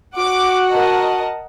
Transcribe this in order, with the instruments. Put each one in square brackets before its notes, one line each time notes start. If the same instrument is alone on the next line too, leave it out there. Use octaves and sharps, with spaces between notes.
[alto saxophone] F#4 [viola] F#5 [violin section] D6
[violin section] A#4 D#5 A5